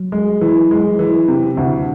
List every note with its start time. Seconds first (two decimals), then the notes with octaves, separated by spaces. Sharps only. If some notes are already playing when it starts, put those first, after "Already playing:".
Already playing: F#3
0.12 G#3
0.41 E3
0.71 G#3
0.99 E3
1.28 C3
1.57 D2